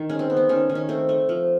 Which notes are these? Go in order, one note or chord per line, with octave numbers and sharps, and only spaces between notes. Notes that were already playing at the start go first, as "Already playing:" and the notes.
Already playing: D#3
G#3 C#4
C4
B3
C4
D#3 C#4
D#3
C#4
A3 C4
A3
F3